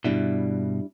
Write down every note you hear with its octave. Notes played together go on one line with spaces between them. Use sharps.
G2 B2 G3 D4 E4